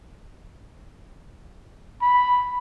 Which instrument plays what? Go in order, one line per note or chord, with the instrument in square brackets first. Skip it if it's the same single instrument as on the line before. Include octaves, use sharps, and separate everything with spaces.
[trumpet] B5